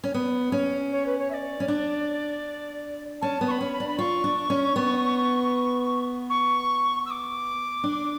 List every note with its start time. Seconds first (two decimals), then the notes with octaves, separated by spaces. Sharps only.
0.04 C#4
0.14 B3
0.52 C#4
0.91 C#5
1.06 B4
1.18 C#5
1.30 E5
1.33 D5
1.60 C#4
1.68 D4
3.21 C#4 A5
3.41 B3
3.47 C#6
3.51 B5
3.61 C#4
3.73 B5
3.80 D4
3.88 B5
3.98 F4 C#6
4.24 D4
4.50 C#4
4.76 B3
6.29 C#6
7.06 E6
7.10 D6
7.84 D4